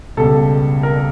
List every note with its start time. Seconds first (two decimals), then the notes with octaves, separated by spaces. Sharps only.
0.17 C#2 B2 G3 A4
0.83 A#4